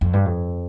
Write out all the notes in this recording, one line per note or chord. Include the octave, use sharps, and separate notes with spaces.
F2
G2
F2